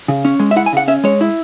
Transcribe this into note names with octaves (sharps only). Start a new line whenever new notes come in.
C#3
C#4
G#3
E5
E4 F#5
G#5
C#3 F#5
C#4 E5
G#3 C#5
E4